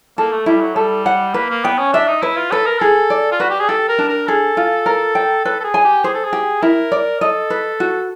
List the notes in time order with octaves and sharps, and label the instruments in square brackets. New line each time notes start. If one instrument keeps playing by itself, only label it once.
[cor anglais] A#3 [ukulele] A4
[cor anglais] A3
[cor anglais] G3 [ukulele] E4
[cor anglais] F#3
[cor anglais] G3 [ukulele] A4
[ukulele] F#5
[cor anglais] A#3 [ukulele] B4
[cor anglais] A#3
[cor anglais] B3 [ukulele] G5
[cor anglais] C#4
[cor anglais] D4 [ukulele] E5
[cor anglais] D#4
[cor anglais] E4 [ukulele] B4
[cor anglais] F4
[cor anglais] A4 [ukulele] B4
[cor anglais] A#4
[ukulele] G#4 [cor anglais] A4
[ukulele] D5
[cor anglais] F4
[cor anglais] F#4 [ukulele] B4
[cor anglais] G4
G#4
[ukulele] G4 [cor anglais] A4
[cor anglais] A#4
[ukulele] D4
[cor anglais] A#4
[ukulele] G#4 [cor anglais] A4
[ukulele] F4
A#4
G5
[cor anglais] A4 [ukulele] B4
[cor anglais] A4
G#4
[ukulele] G#5
[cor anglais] G4
[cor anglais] G#4 [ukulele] C5
[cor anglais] A4
G#4
[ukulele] G4
[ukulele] E4 [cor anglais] A#4
[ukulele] D5
[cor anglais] A4 [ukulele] D#5
[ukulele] B4
F#4